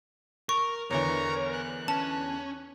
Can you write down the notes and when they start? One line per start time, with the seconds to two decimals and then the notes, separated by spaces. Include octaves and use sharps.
0.49 A#4 C#6
0.91 E2 D3 E3 A#4 C#5 A#5
1.53 F#6
1.88 C#4 A5